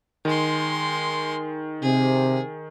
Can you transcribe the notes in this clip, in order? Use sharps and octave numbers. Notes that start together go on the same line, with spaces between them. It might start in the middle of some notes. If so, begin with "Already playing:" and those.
D#3 G#3 C6
C3 G#4